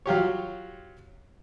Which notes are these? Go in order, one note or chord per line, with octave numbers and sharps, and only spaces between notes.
F#3 F4 G4 C#5